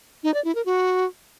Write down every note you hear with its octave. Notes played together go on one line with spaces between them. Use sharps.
D#4
D5
E4
A#4
F#4